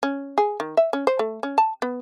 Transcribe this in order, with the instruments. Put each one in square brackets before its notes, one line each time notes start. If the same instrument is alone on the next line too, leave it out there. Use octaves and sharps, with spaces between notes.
[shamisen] C#4
G#4
D#3
E5
C#4
C5
A3
C#4
A5
B3